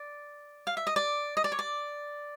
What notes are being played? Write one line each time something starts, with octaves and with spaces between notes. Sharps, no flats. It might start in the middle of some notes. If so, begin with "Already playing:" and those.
Already playing: D5
F5
E5
D#5
D5
D#5
D5
C#5
D5